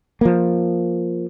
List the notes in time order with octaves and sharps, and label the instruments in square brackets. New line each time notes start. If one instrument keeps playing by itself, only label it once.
[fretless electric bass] F3 A#3